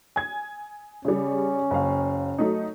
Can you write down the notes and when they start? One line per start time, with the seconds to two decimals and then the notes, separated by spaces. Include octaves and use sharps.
0.16 G#5 G#6
1.05 C#3 G3 C#4
1.71 F#1 F5
2.38 F#3 A3 D#4